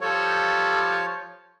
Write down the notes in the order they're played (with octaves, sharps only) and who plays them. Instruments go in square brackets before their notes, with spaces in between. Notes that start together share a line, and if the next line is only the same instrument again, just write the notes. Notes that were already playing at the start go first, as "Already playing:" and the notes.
[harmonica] F3 G3 A4 [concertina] C#5